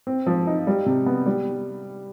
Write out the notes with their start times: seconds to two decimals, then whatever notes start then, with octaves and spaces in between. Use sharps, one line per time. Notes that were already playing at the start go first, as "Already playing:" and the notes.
0.07 C4
0.27 F3
0.47 D#4
0.67 G3
0.86 C3
1.06 B3
1.26 G3